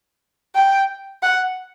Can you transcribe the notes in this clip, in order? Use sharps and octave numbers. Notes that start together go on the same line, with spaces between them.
G5
F#5